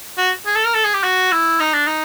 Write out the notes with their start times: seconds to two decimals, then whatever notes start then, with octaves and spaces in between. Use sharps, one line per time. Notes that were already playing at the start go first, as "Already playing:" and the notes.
0.18 F#4
0.46 G#4
0.56 A4
0.66 A#4
0.74 A4
0.84 G#4
0.94 G4
1.03 F#4
1.32 E4
1.60 D#4
1.74 D4
1.87 D#4